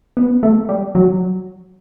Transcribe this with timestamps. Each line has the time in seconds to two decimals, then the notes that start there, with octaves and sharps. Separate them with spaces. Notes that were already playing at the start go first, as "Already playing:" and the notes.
0.17 B3
0.43 A3
0.69 G3
0.95 F#3